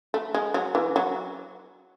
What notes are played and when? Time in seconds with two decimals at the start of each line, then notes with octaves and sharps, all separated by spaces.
0.14 A3
0.34 G#3
0.54 F#3
0.75 E3
0.96 F#3